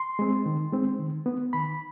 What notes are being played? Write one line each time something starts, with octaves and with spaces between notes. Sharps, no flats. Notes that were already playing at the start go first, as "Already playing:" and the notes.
Already playing: C6
G#3 C4
D#3
G#3 C4
D#3
B3
D#3 B5